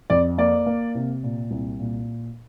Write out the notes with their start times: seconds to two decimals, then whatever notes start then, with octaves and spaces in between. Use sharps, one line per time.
0.10 F2 D5
0.38 A#3 D5
0.66 A#3
0.95 C3
1.23 A#2
1.51 C2
1.80 A#2